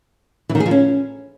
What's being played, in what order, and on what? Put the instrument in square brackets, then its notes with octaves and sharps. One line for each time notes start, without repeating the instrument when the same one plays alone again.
[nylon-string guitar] E3
D#3
G#4
F3
C#4